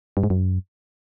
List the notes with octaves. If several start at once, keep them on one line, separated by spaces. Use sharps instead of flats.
G2
G#2
F#2